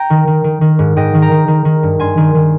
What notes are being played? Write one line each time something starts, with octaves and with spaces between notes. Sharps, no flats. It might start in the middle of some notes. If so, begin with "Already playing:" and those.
Already playing: G5 A#5
D#3
D#3
D#3
D#3
G#2
G#2 D#5 G5
D#3
G5 A#5
D#3
D#3
D#3
G2
G2 G#5 C6
D#3
D#3